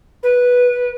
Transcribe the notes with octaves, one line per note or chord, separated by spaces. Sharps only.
B4